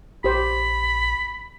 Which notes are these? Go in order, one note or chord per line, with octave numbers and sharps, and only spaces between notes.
A#1 G4 C5 B5